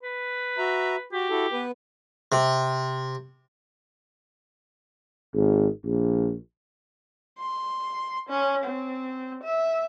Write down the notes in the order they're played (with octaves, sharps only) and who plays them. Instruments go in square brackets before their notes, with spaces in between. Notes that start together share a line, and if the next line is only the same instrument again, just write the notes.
[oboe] B4
[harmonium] F#4 E5 A#5
[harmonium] F#4 [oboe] G4
[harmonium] E4 F#4 A4
B3 B4
[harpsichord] C3
[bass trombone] G#1
A#1
[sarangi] C6
C#4
C4
E5